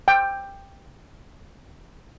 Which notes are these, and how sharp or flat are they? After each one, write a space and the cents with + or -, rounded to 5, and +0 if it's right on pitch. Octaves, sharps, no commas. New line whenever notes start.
G5 +10